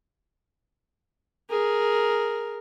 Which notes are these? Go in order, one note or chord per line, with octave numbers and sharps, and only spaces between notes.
G#4 A#4